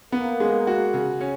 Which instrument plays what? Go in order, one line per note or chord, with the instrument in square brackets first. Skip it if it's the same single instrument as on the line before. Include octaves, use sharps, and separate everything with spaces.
[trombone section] A#3 [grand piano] B3
[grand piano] G#3
F#4
C#3
C#4